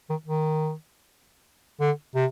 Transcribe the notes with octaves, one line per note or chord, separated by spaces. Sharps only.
D#3
D#3
D3
C3